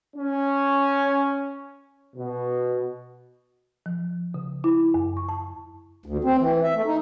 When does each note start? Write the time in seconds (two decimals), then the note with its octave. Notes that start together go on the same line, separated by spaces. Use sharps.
0.17 C#4
2.16 B2
3.86 F3
4.34 C#3
4.64 E4
4.94 F#2
5.17 C#6
5.29 A5
6.06 D2
6.24 C4
6.39 E3
6.63 E5
6.75 A3
6.86 D#4